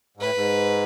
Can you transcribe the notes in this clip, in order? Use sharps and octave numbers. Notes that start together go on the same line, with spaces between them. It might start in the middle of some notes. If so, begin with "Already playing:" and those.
G#2
A2 B4
G#2